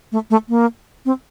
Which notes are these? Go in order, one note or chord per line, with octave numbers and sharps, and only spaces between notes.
A3
A3
A#3
C4